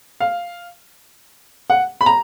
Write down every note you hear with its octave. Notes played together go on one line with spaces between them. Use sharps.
F5
F#5
B5
A#5